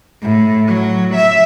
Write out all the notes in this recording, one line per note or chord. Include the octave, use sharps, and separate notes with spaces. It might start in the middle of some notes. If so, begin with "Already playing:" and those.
A2
F#3
E5